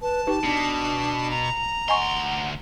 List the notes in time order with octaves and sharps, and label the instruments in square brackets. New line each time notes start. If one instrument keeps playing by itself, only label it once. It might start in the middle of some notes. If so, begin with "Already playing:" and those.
[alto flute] B4 [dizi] A5
[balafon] D#4 B4 [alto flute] G4
[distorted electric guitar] B2 [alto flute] D4
[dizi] A#5
[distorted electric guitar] D2 C6 [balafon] D#5 G#5 C#6 [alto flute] F#5